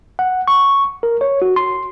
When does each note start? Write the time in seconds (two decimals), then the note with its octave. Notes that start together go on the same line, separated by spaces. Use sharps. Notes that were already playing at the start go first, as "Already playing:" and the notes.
0.19 F#5
0.48 C#6
1.03 A#4
1.21 C#5
1.42 F#4
1.56 C6